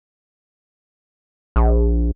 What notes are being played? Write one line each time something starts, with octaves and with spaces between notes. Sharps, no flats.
A#1